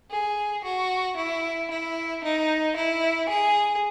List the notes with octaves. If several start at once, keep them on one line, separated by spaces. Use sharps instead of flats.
G#4
F#4
E4
E4
D#4
E4
G#4